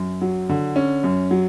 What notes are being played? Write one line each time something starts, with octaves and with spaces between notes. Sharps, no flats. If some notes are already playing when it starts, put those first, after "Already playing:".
Already playing: F#2
F#3
D3
C#4
F#2
F#3